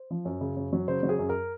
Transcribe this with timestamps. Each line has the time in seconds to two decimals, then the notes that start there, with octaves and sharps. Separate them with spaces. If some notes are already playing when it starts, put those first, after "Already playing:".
Already playing: C5
0.11 F3
0.25 F#2
0.41 C#3
0.57 F#2
0.73 F#3
0.88 C#3 C5
1.03 F#3
1.09 G#4
1.19 F#2
1.29 A#4